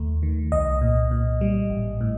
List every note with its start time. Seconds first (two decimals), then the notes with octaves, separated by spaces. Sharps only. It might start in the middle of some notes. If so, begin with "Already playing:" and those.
Already playing: D#2 A3
0.23 D#3
0.52 C2 D#5
0.81 A#2
1.11 A#2
1.41 G3
1.70 A1
2.01 A2